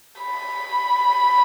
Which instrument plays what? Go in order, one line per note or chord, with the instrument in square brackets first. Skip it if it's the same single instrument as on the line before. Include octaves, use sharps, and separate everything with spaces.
[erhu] B5